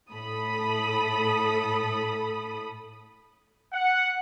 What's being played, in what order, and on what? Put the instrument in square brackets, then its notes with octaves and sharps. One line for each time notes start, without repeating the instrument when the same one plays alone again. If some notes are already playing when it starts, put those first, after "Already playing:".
[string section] A2 A4 B5 D#6
[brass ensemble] F#5